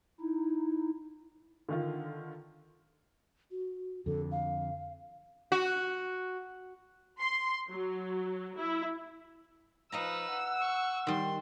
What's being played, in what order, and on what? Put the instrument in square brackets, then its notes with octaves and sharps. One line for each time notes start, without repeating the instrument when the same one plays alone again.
[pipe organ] D#4 E4
[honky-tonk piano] D3 D#3 F4
[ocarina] F#4
[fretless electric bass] F2 D3 [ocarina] A4
[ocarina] F5
[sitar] F#4
[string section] C6
F#3
E4
[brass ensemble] F3 [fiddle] D#4 B4 [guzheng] D#5 F5 A#5 [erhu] E6
[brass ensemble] F#5
[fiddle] C#6
[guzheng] D#3 G3 [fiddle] C6